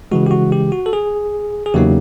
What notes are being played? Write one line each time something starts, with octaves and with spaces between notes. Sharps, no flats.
C#3 E3 G#3 F#4
G4
F#4
G4
F#4
A4
G#4
G#4
E2 C#3 F#3 A#3 D#4 G4